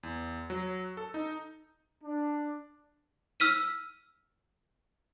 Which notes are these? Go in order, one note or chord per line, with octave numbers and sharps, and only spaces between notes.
E2
F#3
A4
D#4
D4
E6 F6 B6 D#7